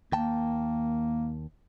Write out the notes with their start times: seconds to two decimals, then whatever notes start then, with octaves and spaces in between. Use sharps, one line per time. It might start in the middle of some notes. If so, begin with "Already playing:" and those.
0.12 D#2 A#3 G5 A5